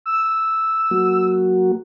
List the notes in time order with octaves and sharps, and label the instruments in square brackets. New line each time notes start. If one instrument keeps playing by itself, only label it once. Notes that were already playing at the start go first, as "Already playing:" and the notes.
[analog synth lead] E6
[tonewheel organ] F#3 A#3 F#4